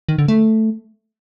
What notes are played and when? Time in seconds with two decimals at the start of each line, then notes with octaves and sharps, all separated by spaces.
0.09 D#3
0.18 D3
0.28 A3